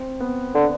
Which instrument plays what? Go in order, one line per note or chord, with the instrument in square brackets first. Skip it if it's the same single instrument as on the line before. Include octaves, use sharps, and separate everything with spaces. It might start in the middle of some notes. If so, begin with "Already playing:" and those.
Already playing: [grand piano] C4
B3
[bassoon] D3